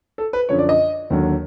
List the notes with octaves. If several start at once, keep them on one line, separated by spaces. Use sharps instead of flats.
A4
B4
F#2 D3 F3 C#5
D5
D#5
D#2 D3 F#3